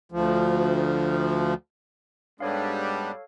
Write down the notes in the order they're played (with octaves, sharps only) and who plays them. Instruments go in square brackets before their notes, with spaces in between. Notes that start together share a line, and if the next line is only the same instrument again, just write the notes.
[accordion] D2 F3
[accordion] G#2 B3 D4 [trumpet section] G3 [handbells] A4 C#5 F5